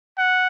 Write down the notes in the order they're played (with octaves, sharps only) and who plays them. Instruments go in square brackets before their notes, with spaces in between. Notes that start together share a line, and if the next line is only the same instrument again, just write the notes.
[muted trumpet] F#5